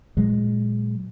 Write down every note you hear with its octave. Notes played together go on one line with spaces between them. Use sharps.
A#2 F#3 G#3